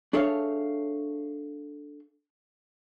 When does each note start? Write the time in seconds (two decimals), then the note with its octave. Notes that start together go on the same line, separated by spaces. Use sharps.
0.13 D4 G#4 A4 C#5 E5 F5